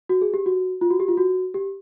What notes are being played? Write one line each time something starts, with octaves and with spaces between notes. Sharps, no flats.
F#4
G#4
G4
F#4
F4
F#4
G4
F4
F#4
G4